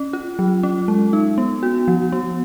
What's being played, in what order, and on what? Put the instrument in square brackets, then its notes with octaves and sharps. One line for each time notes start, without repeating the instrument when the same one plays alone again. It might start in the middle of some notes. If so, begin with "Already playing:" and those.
Already playing: [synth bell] C#4
F4
F#3
C#4
G#3
D#4
B3
F#4
F3
B3